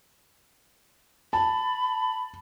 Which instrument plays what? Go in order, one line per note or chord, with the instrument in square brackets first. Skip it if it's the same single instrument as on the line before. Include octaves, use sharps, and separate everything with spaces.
[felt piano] A5 [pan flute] B5